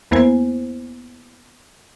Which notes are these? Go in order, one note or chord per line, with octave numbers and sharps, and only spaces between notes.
E2 A#3 B3 E4 C5 G#5